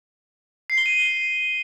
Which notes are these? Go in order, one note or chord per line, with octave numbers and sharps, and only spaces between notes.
C7
G7
D#7